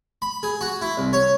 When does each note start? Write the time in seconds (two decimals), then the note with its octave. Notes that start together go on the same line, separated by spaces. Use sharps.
0.22 B5
0.43 G#4
0.61 F#4
0.81 E4
0.97 C2
1.13 C#5